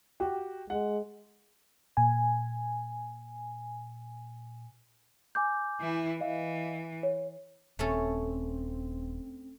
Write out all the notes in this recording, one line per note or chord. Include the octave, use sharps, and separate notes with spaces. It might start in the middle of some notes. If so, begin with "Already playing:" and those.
F#4 G4 G5
G#3 F#5
A#2 G#5
G#5 D6 G6
E3 E4
E3 D#5 F5
C#5
D#1 A3 C4 C#4 A4